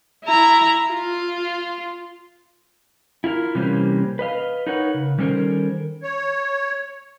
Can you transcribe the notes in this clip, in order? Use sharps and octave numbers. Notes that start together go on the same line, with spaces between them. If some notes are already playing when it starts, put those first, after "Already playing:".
E4 A#5
F4
E4 F4 A4 A#4
C3 E3 G3 A#3 C4 C#4
B4 D#5 F5
D#4 A#4 B4 C#5 F#5
C#3
D#3 G3 C#4 A4 A#4 C5
C#5